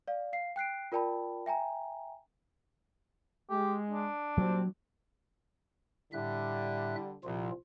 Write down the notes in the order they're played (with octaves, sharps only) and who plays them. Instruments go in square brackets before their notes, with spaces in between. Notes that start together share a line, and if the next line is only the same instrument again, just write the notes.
[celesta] D5 F5
F5 C7
G5 F#6 C7 D7
F4 A#4 D5 G5 A5 B5
E5 G5 G#5 A#5
[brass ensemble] G#3 [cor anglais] G4
[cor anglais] D4
[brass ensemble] A#2 G3 C4 [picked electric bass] F#3
[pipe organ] A2 E5 F#6 [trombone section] D3 G3
[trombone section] C2 [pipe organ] A#2 F3 F4